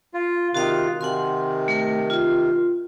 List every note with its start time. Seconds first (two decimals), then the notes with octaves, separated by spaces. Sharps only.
0.14 F4
0.54 C3 D#3 F4 F#4 F5 D#6
1.01 C3 D#3 F#5 G#5 C6
1.68 A3 A#4
2.10 F4